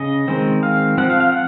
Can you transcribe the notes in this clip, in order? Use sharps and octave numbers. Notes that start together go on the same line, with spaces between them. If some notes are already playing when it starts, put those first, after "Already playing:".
Already playing: C#3 C#4 D#5
D#3 G#3 C4
F5
F3 C4 F#5
F5
F5
F#5